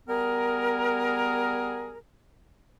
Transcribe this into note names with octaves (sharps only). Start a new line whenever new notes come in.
G3 B3 G#4 A#4